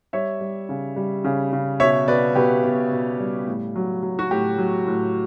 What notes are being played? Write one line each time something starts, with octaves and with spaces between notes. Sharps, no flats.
G3 C#5 E5
G3
C#3
G3
C#3
C#3
B2 C#5 E5
B2 B4 D5
B2 G4 B4
B2
B2
G3
A2
F#3
F#3
F#4
A2 G4
F#3
A2